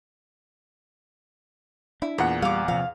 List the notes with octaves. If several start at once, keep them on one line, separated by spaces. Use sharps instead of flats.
D4 E4
E2 A#2 E5 F#5
G3 F5 D6
C3 F3 F5